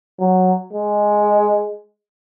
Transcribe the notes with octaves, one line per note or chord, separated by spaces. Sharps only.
F#3
G#3